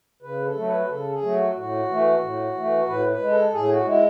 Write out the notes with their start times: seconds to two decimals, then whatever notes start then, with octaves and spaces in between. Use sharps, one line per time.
0.22 C#3 B4
0.46 A4
0.56 F#3 A3
0.66 B4
0.89 C#3 A4
1.11 G#4
1.22 F#3 A3
1.33 F#4
1.54 A2 F#4
1.88 E3 A3
2.21 A2
2.54 E3 A3
2.86 A2 B4
3.09 B4
3.20 G#3
3.30 A4
3.52 A2 G#4
3.69 F#4
3.85 G#3 E4